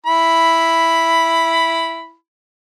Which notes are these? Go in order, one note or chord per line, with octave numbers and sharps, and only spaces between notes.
E4 B5